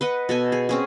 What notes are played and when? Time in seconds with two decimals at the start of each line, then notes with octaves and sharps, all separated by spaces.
0.01 B4 D#5 F#5
0.29 B2 A4 G#5
0.52 G#4
0.69 C4 C#4 G#4